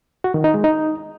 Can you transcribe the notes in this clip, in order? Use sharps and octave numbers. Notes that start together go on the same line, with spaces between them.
F#4
D#3
D#4
G#3
D#4